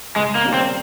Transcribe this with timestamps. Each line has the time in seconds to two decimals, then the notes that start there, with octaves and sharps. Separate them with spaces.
0.16 C#2 G#3
0.35 A#3
0.44 C3 D#3 G3 C#4
0.54 C4